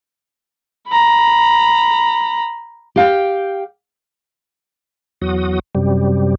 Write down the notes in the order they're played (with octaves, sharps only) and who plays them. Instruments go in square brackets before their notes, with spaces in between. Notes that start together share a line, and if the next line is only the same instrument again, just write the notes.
[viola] A#5 B5
[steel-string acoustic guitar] G4 F5 G5
[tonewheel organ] E2 F#3 F#4 D#6
F#2 C3 G3